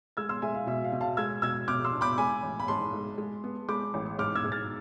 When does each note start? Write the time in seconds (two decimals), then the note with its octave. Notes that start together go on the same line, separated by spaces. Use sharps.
0.17 G#3 E6 G#6
0.29 C6 E6
0.42 G#3 E5 G#5
0.54 F5
0.67 B2 E5
0.84 F5
0.92 B2
1.01 F5 A5
1.17 G#3 E6 G#6
1.42 B2 E6 G#6
1.68 B2 D6 F6
1.84 C6 E6
1.93 D4
2.01 B5 D6
2.18 G#3 G#5 B5
2.43 A1
2.60 B5
2.68 G#2 A5 C6
2.93 G#3
3.18 G#3
3.44 B3
3.68 G#3 B5 D6
3.94 A1
4.19 G#2 D6 F6
4.35 E6 G#6
4.44 G#2
4.52 F6 A6